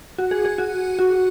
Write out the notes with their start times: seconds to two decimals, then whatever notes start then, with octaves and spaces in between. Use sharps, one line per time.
0.18 F#4
0.31 G#4
0.45 G#4
0.58 F#4
0.99 F#4